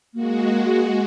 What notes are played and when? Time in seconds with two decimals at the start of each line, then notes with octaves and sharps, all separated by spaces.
0.14 G#3 A#3 F#4